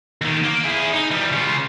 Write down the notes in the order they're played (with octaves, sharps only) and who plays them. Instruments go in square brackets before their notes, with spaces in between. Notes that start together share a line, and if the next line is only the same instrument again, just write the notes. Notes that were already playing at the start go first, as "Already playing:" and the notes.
[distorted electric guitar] D#2 D#3
A#3
E4 G#4
D#4
E3 G3
C#3 F4